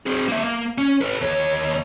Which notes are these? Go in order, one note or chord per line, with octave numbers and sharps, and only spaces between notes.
C4 G#4
A#3 E5
A#3
C#4
A4 B4
D#2 C#5